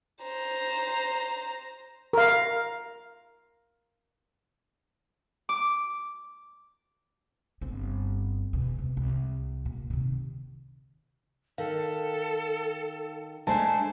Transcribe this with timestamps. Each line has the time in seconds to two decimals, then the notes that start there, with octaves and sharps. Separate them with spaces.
0.23 C5 A#5
2.13 A#4 F5
5.49 D6
7.61 G1 C4
8.53 E2 B2
8.78 C3
8.97 C2
9.65 A#2
9.90 C3 D#3
11.58 D#3 A4 F5
13.47 G#3 A3 D4 C5 G#5 A5